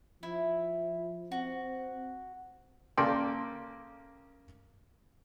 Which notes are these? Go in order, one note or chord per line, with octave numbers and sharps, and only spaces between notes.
F3 E4
C4 F#4
C#3 A#3 A4 D5 G5 C6